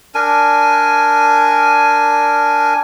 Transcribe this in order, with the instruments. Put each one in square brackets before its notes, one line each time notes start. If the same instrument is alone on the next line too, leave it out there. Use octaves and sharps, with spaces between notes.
[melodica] D4 A#4 G#5